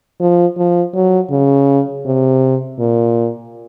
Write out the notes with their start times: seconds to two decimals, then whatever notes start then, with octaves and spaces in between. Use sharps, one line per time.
0.20 F3
0.58 F3
0.94 F#3
1.31 C#3
2.05 C3
2.79 A#2